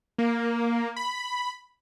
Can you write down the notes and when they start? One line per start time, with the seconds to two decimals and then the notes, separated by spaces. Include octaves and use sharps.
0.18 A#3
0.96 B5